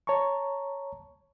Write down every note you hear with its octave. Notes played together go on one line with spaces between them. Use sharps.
C#5 A5 A#5 C#6